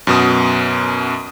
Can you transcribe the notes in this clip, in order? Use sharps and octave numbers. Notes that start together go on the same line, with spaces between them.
F#2 B2 D#6